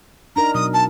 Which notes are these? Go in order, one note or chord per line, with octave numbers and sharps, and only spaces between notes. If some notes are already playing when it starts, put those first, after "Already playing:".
D4 D#4 A#4 A#5
B2 F#3 D#6
A5